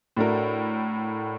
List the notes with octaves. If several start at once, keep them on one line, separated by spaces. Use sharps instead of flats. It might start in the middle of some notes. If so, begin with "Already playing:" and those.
A2 A3 D4 F#4 A#4